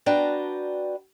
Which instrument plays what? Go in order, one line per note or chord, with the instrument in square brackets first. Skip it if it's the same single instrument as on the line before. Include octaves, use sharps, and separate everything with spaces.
[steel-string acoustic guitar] D4 F#4 B4 G5 A5 A#5